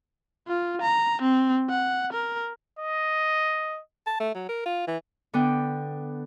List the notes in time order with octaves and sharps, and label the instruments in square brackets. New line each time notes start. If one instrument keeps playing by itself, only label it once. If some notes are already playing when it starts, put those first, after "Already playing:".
[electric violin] F4
A#5
C4
F#5
A#4
[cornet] D#5
[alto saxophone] A5
A3
F#3
A#4
F4
E3
[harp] D3 B3 G5